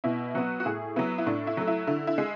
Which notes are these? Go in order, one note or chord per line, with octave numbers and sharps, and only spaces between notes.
B2 E4
F#3 B3 F#4
F#4
A2 G#4
F#3 B3 E4
E4
A2 D4
E4
F#3 A3
E4
D3 E4
E4
G#3